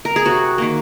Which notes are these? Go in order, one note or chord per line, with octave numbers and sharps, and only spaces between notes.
A#4
G#4
C3 F#4
D#3 A#3